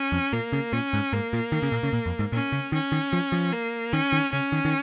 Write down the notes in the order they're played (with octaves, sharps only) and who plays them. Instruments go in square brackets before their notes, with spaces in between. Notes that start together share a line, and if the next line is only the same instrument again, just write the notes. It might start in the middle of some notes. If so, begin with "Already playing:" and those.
Already playing: [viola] C#4
[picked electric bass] F2
[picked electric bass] A#2 [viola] A#3
[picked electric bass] C#3
[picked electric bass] A#2 [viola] C#4
[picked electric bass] G#2
[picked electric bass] G#2 [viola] A#3
[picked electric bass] A#2
D#3
C#3
A#2
C#3
A#2
F2
G#2
[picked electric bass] A#2 [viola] C#4
[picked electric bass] C#3
[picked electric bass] D#3 [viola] C#4
[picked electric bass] D#3
F3
F3
[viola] A#3
[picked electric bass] D#3 [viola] C#4
[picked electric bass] D#3
[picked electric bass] C#3 [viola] C#4
[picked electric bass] D#3
D#3